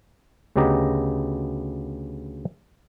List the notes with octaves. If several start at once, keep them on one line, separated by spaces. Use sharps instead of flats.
D2 C#3 B3 G4 D#5 A#5